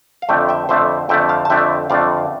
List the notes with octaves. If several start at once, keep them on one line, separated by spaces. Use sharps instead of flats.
F5
F2 D3 A3 E5 G5
E5 G5
F2 D3 A3 C5 E5
F2 D3 A3 E5 G5
F5 A5
A5
F2 D3 A3 E5 G5
F2 D3 A3 D5 F5